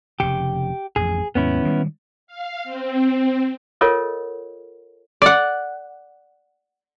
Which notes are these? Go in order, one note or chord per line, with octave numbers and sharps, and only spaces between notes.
F1 C#3 G4
A1 F2 G#4
D#2 G#2 B3 C#4 E4
D#3 G3 G#3
F5
C4
F4 A4 A#4 C#5 D#5 F#5
D5 F#5